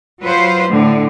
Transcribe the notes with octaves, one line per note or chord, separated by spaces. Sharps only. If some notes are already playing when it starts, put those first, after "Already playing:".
F#3 F4 B4 C5
A2 D3